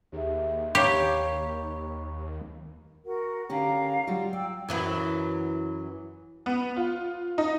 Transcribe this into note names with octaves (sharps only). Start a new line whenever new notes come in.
D#2 G4 G#4 E5
G4 C#5 F5 A#5 B5 C#6
F#4 A#4 F#5
D3 C#4 G4 F5 A#5
F#3 G3 F4 F#5
D5 G5 E6
F#2 E3 F#3
B3
F4
D#4